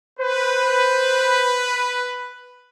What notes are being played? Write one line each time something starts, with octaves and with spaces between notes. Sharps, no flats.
B4 C5